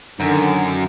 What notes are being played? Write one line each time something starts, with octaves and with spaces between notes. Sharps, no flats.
F#2 D3 D#3 D4